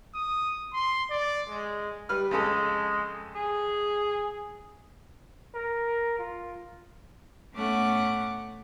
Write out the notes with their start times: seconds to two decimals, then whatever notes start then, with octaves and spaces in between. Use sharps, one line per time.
0.14 D#6
0.73 C6
1.10 D5
1.49 G#3
2.09 G3 B4 F6
2.31 F2 C#3 G#3 A4
3.36 G#4
5.55 A#4
6.19 F4
7.54 A2 A3 B3 C#4 F#5 D6